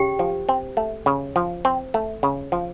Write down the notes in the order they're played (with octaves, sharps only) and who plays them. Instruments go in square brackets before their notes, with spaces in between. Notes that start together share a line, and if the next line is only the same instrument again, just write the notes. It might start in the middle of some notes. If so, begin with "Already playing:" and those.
Already playing: [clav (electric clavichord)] C#3 [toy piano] G4 G5
[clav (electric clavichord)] F3
C4
A3
C#3
F3
C4
A3
C#3
F3